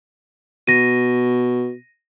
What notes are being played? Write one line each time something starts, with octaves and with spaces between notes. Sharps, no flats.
B2 A#6 D#7